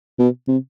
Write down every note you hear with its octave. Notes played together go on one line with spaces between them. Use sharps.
B2
C3